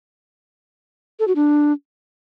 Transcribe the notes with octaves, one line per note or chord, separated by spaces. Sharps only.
A4
F#4
D4